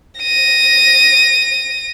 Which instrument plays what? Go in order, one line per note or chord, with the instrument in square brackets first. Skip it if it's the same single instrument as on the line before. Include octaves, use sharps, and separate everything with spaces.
[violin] A#6 D#7